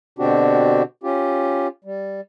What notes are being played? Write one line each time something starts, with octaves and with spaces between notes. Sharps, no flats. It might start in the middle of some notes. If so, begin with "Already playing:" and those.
B2 D3 C4 D4 F#4 G4
C#4 F4 G4
G3